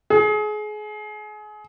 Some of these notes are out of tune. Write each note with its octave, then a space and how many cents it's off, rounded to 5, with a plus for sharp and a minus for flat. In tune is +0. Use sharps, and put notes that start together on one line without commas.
G#4 +30